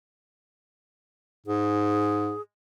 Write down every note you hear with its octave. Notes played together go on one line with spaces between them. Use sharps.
G#2 G#4